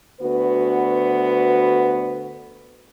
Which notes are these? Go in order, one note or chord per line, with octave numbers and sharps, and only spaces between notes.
D2 B3 F#4 B4